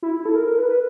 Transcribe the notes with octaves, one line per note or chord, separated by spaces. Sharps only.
E4
E4
A4
A#4
A#4
B4
B4